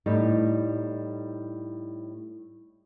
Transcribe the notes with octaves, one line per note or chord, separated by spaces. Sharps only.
A2 G3 D#4